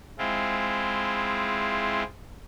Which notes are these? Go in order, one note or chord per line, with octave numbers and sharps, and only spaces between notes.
G#3 C4 E4 F4